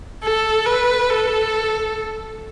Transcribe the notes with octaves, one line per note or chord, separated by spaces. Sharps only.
A4
B4
A4